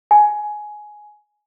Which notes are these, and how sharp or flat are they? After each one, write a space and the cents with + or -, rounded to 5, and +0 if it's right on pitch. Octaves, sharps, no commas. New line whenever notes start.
G#5 +15